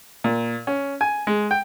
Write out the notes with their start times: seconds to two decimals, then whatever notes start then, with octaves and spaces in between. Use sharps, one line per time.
0.24 A#2
0.67 C#4
1.01 G#5
1.27 G#3
1.51 G5